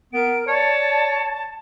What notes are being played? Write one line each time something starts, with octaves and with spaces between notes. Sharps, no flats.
B3 A#4 D7
C#5 D5 A5